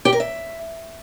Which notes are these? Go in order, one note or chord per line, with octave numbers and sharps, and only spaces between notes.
G4
A#4
E5